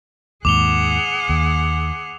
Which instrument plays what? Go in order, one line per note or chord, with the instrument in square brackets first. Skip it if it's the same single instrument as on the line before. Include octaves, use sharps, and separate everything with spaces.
[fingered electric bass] D#2 G#2 [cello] G#4 F#5 [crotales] D6 F7 G7
[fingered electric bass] D#2